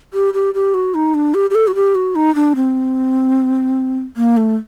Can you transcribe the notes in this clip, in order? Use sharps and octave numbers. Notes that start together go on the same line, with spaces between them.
G4
G4
G4
F#4
D#4
D4
G4
G4
A4
F#4
G4
F#4
D#4
D4
C4
A#3
A3